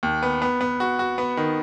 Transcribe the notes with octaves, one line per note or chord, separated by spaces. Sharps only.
D#2
B3
B3
B3
F#4
F#4
B3
D#3